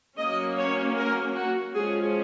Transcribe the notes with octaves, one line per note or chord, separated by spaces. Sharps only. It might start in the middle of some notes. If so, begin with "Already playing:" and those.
F#3 A#3 C#4 D#5
C#5
A#4
F#4
F3 G#3 C#4 G#4